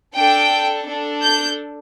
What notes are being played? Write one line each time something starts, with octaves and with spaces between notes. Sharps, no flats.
D4 A4 G5
D4 A4
G6